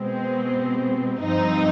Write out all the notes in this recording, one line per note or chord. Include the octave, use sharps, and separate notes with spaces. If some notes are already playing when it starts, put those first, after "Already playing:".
Already playing: B2 G#3 C4
G2 F3 C4 D#4